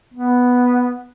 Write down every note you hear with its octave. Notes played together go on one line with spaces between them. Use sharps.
B3